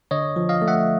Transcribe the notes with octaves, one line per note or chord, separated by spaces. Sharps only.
D3 C#5 D#5
F3
D#5 F5
A3
E5 F#5